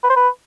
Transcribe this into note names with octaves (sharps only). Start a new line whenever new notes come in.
B4
C5
B4